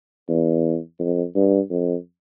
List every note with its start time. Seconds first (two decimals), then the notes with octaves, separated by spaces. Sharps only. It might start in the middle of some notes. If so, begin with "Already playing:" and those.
0.28 E2
0.99 F2
1.35 G2
1.70 F2